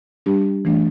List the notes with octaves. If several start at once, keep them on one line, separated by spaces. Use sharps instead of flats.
G3 D4 G4
E3 A3 D4